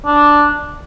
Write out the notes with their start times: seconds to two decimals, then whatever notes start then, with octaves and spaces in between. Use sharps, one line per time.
0.06 D4